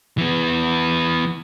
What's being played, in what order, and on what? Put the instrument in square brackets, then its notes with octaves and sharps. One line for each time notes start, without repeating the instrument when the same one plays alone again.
[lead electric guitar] E3 B3